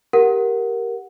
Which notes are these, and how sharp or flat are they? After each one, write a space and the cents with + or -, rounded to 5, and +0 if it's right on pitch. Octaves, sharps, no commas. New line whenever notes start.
G4 +0 A#4 +0 F#5 +0